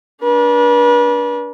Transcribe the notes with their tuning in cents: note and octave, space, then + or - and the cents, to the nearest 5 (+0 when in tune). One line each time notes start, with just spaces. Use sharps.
D4 -20 B4 -40